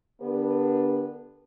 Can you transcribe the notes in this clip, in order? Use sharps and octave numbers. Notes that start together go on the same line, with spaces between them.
D3 B3 D4 G4 A#4 B4